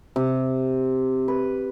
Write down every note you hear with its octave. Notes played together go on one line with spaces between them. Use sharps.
C3
B4